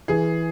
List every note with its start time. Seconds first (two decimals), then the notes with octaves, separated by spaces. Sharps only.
0.08 E3 G#4